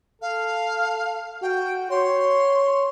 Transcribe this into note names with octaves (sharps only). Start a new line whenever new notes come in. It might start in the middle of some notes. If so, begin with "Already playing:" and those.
A4 F5
F#4 G5
C#5 C6